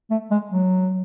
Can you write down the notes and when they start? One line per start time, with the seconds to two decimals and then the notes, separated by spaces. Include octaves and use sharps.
0.10 A3
0.31 G#3
0.52 F#3